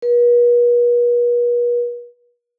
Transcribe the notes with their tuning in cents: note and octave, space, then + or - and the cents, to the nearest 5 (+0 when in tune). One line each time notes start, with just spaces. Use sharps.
B4 -45